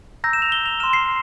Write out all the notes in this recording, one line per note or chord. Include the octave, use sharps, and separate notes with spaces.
A#5 E6 G6 A#6
E7
F7
G7
F7
C6 F6 E7
C7